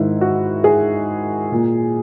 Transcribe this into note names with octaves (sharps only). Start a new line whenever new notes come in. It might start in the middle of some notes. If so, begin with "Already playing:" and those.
Already playing: G#2 D#3 E4
F#4
G#4
A#2